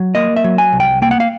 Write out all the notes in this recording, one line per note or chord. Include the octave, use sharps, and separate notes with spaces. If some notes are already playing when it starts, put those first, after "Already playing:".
Already playing: F#3
A#3 D#5
E5
F#3
G#5
C2
G5
A#3 G5
F#5
F5